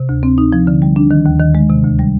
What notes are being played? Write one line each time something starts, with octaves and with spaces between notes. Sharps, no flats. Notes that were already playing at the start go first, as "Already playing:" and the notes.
Already playing: C3
D2
C4
D#4
F3
D3
G3
D4
D#3
D#2
D#3
G#3
C3
D2
G3